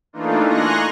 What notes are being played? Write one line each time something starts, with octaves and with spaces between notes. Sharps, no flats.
E3 A3 A#3 D4 D#4 F4
G#5 A#5 C6 C#6 F#6 A#6